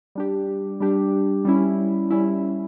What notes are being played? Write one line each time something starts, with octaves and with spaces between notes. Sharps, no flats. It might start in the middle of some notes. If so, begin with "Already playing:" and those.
G3 D4 G4
G3 D4 G4
G3 C#4 E4
G3 C#4 E4